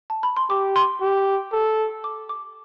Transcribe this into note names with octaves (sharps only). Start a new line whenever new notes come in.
A5
B5
C6
G4 D6
C6
G4
A4
D6
D6